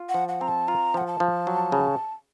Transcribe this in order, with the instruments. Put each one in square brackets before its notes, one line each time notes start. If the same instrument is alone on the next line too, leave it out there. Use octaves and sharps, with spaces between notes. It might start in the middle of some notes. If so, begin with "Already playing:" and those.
Already playing: [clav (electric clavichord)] F4
[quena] F#5
[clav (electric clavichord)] F3
[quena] F#5
[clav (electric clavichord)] C4 [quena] A#5
[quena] A5
[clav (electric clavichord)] F4 [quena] A#5
[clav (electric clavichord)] F3 [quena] F#5
[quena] A5
[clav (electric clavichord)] F3
F#3
C#3